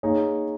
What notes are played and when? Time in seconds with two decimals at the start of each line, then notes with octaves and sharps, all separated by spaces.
0.03 A#3 D#4 G#4 C#5